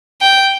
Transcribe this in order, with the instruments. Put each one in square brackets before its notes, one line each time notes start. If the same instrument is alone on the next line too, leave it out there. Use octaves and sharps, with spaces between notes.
[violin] G5